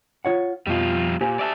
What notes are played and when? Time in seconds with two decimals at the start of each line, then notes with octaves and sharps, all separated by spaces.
0.25 F4 C#5 F#5
0.67 F2 B2 F3 G3 F4
1.21 A#2 G4 C5 G#5
1.39 D5 E5 A5